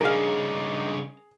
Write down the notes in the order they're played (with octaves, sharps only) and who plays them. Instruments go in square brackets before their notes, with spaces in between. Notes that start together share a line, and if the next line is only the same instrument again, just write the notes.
[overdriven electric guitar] G2 C#3 [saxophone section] G#3 D4 D#4 [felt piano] G#4 [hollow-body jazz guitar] A#4 F5